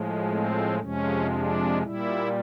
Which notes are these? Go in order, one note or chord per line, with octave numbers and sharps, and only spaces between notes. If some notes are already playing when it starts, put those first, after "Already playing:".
Already playing: A2 F3 G#3
C4
F2 C3 F3 G#3 C#4
D4
A#2 G3 E4